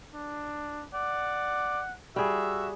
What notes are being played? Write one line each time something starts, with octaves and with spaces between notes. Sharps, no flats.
D4
D5 F#5
G3 F#4 G#4 E5 E6